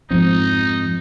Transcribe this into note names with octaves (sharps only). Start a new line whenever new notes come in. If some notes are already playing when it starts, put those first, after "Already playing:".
F2 G#2 F3 C4 D#4